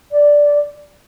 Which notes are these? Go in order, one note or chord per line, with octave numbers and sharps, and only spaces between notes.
D5